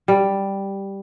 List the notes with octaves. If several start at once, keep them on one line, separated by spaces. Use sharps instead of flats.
G3